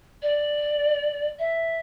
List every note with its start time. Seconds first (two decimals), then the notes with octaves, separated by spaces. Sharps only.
0.22 D5
1.39 E5